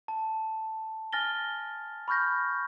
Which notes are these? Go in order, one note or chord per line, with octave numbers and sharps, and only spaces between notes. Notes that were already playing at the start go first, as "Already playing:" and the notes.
A5
G#5 F6 A6 A#6 G7
B5 C#6 F6 G6 A#6